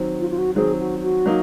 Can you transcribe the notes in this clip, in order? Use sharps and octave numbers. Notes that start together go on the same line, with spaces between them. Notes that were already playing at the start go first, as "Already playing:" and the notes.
Already playing: D#3 F#3 C4
F4
F4
F#4
D#3 F#3 C4 G#4
F#4
F#4
F#3 A#3 D#4